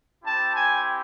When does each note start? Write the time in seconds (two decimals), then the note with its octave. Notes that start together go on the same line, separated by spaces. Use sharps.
0.24 C4 E4 G4 A5
0.55 G#5